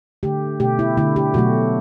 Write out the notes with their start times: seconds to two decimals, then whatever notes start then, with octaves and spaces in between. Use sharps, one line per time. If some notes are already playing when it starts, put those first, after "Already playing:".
0.23 D3 A3 G4
0.60 B2 A3 G4
0.79 E4
0.97 D3 A3 E4
1.16 G4
1.34 B2 F#3 A3 F#4